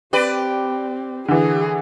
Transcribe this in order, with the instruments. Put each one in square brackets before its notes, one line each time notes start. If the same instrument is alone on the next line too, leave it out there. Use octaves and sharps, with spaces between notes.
[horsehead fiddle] C4 [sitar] G4 B4 D5
[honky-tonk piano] D3 E3 [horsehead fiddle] G#4